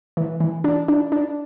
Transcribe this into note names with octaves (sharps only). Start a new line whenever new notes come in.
E3
E3
D4
D4
D4